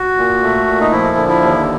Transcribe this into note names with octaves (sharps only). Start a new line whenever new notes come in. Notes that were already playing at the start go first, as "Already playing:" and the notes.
Already playing: F#4
A#2
A3
A#2
D#4
F3 E4
D3
E4
D#2